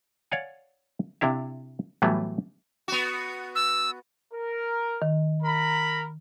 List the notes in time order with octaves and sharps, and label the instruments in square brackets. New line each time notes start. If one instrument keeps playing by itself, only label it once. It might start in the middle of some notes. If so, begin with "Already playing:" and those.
[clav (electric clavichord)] C#5 D5 F5 F#5 G#5
C3 D4 E4 F5
A2 E3 F#3 G3 A3 B3
[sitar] B3 F#4
[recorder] E6
[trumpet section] A#4
[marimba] D#3
[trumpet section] A#4 A#5 B5